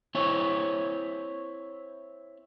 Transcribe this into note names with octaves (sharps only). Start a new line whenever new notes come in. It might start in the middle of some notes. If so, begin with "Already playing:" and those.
C4 E4 C#5